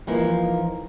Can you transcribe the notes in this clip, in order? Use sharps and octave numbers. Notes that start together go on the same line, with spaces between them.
E3 F3 A#3 D#4